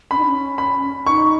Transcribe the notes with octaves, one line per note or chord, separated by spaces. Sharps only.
C#4 B5
D#4
C#4
B5
D#4 C#6